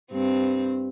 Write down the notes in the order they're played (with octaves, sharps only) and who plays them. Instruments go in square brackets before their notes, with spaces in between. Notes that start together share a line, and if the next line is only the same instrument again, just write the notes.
[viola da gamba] G2 C4